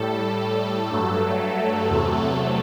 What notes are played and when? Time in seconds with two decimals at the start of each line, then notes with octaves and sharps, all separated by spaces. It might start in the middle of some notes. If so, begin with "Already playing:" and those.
Already playing: A2 G3 A4
0.40 A4
0.90 G2 F#3 A3
1.39 A4
1.89 E2 C3 F#3 A3